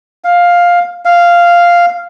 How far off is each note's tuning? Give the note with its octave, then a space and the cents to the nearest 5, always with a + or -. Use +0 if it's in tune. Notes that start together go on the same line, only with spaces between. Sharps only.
F5 +10
F5 -5